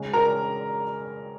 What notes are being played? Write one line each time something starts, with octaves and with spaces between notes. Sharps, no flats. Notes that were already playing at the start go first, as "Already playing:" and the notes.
Already playing: C#3 G#3 C#4
A#4 A#5